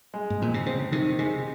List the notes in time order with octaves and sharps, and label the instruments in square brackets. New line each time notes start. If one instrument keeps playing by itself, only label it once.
[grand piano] G#3
[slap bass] G#2
[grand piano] F2 [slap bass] A#2
[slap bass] C3
[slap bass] C#3 [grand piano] C4
[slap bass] C3 [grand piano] D#3
[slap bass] C3 [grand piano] G#3